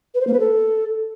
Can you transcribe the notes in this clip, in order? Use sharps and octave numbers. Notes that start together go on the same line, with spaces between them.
B4
C5
A#3
B4
A4